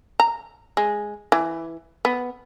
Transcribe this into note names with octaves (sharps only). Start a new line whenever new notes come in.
A#5
G#3
E3
B3